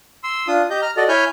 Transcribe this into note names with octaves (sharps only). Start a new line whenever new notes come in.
C6 E6
D4 F4 D#6
G4 D#5 G6
A#5 F6
F#4 A4 D5 D#5
E4 C#5 G#5 F6 G6